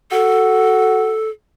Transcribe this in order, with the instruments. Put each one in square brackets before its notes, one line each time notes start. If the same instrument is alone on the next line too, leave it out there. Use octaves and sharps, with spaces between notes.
[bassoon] F#4 [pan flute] A4